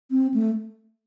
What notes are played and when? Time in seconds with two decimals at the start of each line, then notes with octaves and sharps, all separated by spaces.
0.11 C4
0.34 A3